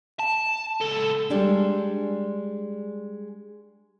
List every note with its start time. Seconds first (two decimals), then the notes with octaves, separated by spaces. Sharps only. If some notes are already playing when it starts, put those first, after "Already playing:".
0.19 A5
0.81 C#2 A4
1.30 G3 G#3 D4